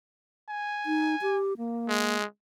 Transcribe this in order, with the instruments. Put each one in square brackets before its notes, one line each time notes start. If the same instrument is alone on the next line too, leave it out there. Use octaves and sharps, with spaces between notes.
[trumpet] G#5
[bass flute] D#4
G4
A#3
[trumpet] G#3